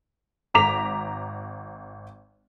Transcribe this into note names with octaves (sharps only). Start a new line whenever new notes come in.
G#1 A#5 D6 B6 F7